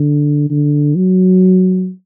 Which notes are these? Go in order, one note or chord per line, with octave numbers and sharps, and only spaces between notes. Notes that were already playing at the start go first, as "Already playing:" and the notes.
Already playing: D3
D3
F#3